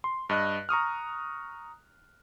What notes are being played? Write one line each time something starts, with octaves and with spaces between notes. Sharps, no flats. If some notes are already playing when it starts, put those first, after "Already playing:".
C6
G2 D#5 F#6
A#5 C#6 D#6 F6